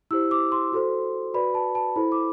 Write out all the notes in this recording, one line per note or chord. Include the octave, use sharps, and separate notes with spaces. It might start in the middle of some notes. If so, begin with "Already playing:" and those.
E4 G4 C5 E6
D6
C6
F#4 A4 C5
F#4 B4 D5 B5
A5
A5
E4 A4 C5 B5
D6